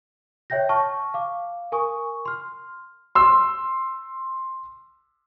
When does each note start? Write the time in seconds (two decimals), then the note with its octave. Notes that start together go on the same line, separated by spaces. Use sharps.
0.50 C#5 E5 G5 G6 A#6
0.69 A5 C#6 F6
1.14 F5 D6
1.72 A#4 G#5 C#6 D#6
2.25 C6 F6
3.15 C6 E6